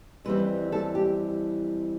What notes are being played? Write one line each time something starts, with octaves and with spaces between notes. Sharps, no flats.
F2 E3 G3 C4 B4
A4
G4